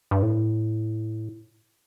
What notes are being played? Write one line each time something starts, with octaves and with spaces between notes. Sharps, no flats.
G2
A2